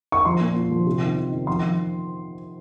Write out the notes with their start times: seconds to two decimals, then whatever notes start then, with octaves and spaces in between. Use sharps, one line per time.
0.12 C#6
0.25 F3 C6
0.41 A#2
0.56 A#2
0.72 F3
0.86 C3
1.02 D#3
1.18 D#3
1.32 D#3
1.47 F3 C6
1.63 F3